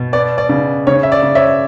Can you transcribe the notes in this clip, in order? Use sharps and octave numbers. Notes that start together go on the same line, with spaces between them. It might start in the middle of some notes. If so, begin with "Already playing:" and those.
Already playing: B2
B3 D5
D5
C#3
C#3 C#5
E5
D5
C#3
C#5 E5